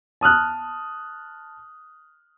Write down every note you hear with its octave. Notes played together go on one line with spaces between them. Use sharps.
A5 D#6 F6 F#6